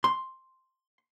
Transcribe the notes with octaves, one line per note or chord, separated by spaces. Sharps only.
C6